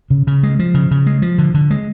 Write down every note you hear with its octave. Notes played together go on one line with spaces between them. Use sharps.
C#3
C#3
G#3
F3
C#3
C#3
G#3
F3
D3
D3
G#3